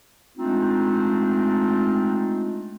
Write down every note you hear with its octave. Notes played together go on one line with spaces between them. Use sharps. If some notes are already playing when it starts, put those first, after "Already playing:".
G#3 A3 C4 D4 D#4 F4